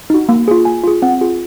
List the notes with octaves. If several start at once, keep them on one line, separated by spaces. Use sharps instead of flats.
D#4 F#4
A#3
F4 G#4
A#3 G#5
F4 G#4
C4 F#5
F4 G#4